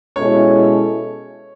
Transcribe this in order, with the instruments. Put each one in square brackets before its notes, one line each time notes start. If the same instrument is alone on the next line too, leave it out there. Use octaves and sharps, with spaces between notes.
[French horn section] B2 G#3 C#4 E4 A4 [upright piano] C#5